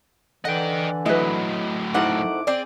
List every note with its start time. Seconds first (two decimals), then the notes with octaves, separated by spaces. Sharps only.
0.45 D3 E3 D#5 F#5 G5
1.06 A2 F#3 E4 B4 D#5
1.94 F2 A3 D#4 E4 A#4 C5 F#5 D6
2.47 C4 G#4 D5